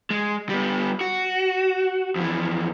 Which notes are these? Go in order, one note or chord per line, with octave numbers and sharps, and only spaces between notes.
G#3
G3 B3
F#4
F2 E3